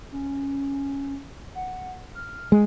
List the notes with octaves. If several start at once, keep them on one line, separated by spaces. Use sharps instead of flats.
C#4
F#5
F6
G#3 G#5